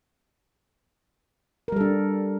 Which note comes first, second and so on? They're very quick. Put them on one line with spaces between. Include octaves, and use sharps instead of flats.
A#4 G3 A4 D4